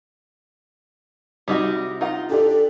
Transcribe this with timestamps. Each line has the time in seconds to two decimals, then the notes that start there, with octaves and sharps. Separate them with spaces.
1.48 C2 G3 D#4 F#4
2.01 D#4 F4 F#5
2.30 D4 G4 A4 D5
2.49 A4